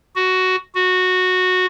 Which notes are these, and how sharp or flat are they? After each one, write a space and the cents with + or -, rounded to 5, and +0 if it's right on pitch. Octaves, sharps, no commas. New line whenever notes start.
F#4 +5
F#4 -10